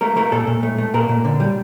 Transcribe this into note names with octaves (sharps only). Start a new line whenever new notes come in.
A3 A#4
A3 A#4
A#2 A4
A#2
A3
A3
A#2 A#4
A#2
D3
G3